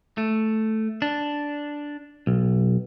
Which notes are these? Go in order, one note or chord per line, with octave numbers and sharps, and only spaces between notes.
A3
D4
B1